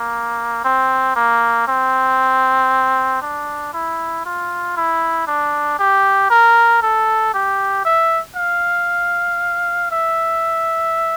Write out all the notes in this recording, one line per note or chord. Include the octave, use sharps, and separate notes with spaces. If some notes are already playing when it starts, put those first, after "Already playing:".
Already playing: A#3
C4
A#3
C4
D4
E4
F4
E4
D4
G4
A#4
A4
G4
E5
F5
E5